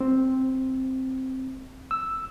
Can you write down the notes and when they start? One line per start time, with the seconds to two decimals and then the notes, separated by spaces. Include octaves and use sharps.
0.01 C4
1.91 E6